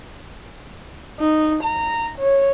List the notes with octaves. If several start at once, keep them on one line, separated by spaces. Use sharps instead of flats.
D#4
A#5
C#5